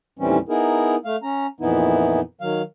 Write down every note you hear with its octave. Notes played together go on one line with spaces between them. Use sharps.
D#2 A2 E3 G3 C4 C#4
B3 D#4 E4 G#4 A#4
A3 F5
C#4 A#5
F2 A#2 E3 B3 D#4 E4
D#3 F#3 F5